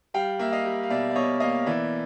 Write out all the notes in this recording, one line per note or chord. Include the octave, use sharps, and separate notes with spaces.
G3 F5 G5
A#3 E5
D#5 F5
G3
F5
B2 D5 E5
D5
B2 C#5 D#5
A#3 D#5 F5
E3 D5 E5